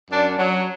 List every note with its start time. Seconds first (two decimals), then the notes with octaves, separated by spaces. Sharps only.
0.11 F#2 D4
0.39 F#3